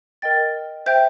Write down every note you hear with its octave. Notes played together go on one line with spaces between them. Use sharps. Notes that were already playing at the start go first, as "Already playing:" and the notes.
A#4 D#5 G5 A6
C5 E5 G5 G6